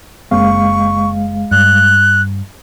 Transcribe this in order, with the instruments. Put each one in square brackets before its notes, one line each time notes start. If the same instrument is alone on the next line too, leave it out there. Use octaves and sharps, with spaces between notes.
[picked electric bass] F#1 A#3 C4 [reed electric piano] G#3 F5 [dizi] C#6
[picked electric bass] G2 [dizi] F#6